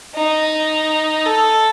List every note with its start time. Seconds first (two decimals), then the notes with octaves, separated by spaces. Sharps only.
0.15 D#4
1.25 A4